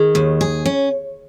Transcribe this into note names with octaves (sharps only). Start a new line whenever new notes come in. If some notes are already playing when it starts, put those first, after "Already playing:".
Already playing: D#3 G#4
D#2
G#4
C#4